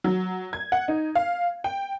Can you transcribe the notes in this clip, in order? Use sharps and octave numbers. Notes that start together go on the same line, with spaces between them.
F#3
G#6
F#5
D#4
F5
G5